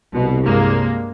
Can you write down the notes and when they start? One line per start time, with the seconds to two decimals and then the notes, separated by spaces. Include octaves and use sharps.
0.13 C2 B2
0.45 G2 G#3 A#3